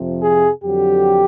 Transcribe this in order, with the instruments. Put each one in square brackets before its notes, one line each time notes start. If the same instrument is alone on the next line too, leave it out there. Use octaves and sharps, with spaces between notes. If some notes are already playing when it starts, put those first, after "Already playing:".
Already playing: [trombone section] F2 C3 F3
G#4
F2 D3 F#3 G4